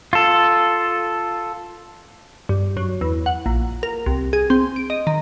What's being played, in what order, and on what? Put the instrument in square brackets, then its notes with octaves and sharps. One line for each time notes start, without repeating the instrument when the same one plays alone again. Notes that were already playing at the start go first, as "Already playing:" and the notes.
[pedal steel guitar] F4 A4
[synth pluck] G2
F#2
E2
F#5
A#1
A#4
C2
G#4
C4
D7
D#5
D#3